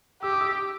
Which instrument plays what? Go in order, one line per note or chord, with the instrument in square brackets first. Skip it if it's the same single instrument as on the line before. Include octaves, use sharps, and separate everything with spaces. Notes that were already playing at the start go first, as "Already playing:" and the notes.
[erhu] G4 [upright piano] E6
[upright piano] D#6
D6 E6